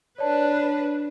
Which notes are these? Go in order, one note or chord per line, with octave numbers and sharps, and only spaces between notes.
D4 B4 C#5 D5 A5